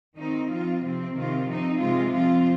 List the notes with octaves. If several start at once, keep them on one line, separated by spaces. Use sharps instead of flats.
D#3 C4 D#4
F3 C4 F4
C3 F3 C4
C3 D#3 C4 F4
F3 C4 D#4
C3 G#3 F4
F3 C4 F4